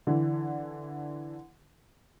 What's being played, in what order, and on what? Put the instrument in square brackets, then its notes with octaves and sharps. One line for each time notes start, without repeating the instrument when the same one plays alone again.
[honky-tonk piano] D3 E3